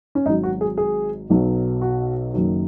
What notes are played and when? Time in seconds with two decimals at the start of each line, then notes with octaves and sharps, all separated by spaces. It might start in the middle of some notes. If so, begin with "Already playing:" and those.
0.15 C#4
0.26 G#1 G#2 F#3 D#4
0.43 F#4
0.61 G#4
0.77 G#4
1.30 B1 B2 F#3
1.82 F#4
2.34 F#1 F#2 D#3 F#3